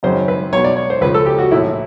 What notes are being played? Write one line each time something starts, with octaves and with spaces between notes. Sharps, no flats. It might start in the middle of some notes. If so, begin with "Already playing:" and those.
G#1 F#2 C#3 C5
B4
B1 B2 C#5
D5
C#5
C5
C#2 C#3 F3 B4
A4
G4
F#4
A#1 A2 E3 E4